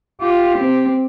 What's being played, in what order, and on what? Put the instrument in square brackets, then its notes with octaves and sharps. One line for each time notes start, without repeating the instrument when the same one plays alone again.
[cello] F4 [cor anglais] G4
[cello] C4